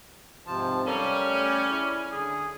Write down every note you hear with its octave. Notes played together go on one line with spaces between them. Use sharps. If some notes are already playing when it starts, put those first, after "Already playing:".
G#2 C3 F3 A5
G3 C#4 A4 A#4 F5
A3
E4 G#4 D5
D3 G#4